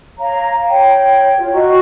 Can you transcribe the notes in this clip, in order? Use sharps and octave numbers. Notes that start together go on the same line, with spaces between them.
C#5 F5 A#5
C#5 G5
F4
F#4 D#5 A#5 C#6